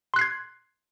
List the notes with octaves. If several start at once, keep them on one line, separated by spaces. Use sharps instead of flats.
C6 F#6 G#6 C7